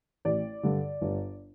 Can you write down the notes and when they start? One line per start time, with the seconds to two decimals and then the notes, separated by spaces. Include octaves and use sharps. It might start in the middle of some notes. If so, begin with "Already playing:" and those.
0.25 A1 D5
0.63 G2 D3
1.01 G1